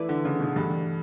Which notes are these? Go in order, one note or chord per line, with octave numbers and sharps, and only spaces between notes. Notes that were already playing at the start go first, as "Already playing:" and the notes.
Already playing: E3 A3 E4 B4 D5
D3
C#3
B2
G2 E3 A3 D4 A4